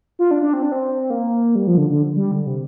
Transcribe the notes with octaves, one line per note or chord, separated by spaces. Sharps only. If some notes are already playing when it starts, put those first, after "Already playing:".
F4
D4
D4
C4
D4
C4
A#3
G3
F3
D3
D3
G3
D3
C3